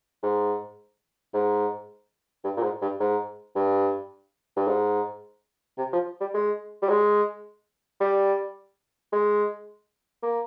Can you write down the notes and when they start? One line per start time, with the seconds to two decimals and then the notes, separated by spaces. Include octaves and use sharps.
0.23 G#2
1.34 G#2
2.44 G2
2.57 A#2
2.63 G#2
2.82 G2
3.00 G#2
3.56 G2
4.57 G2
4.68 G#2
5.78 C3
5.93 F3
6.21 G3
6.34 G#3
6.82 G3
6.89 G#3
8.01 G3
9.13 G#3
10.23 A#3